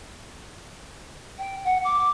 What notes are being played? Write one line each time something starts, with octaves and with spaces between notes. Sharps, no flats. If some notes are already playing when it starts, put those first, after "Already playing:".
G5
F#5
D6